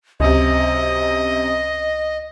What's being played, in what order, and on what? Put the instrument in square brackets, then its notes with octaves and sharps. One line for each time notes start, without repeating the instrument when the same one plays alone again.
[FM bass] C#2 [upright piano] F#2 C3 [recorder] D#5